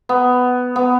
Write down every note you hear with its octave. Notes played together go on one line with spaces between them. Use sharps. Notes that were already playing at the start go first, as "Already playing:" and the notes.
B3
B3